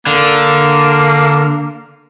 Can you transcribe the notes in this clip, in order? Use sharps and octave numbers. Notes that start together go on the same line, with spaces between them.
D3 A#3